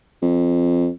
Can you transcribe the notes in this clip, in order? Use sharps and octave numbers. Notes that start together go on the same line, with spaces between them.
F2